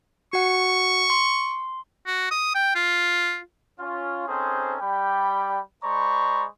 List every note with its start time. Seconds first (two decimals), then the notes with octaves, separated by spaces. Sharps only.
0.33 F#4 F#5 C#6
1.10 C6
2.07 F#4
2.31 D#6
2.55 G5
2.75 F4
3.79 C#4 F4
4.27 C4 C#4 D#4 G#4 A4 C5
4.80 G3 G5 B5
5.84 G#3 C5 D5 A#5 B5 C#6